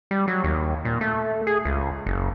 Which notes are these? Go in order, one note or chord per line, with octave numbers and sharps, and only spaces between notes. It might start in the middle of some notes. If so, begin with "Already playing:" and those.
G3
F#3
D#2
A#2
A3
G#4
C#2
F#1